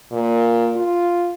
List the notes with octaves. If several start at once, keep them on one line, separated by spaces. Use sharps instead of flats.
A#2
F4